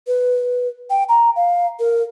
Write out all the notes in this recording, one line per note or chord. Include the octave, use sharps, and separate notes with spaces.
B4
G5
A#5
F5
A#4